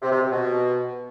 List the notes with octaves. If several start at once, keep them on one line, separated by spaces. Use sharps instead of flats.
C3
C3
C3
B2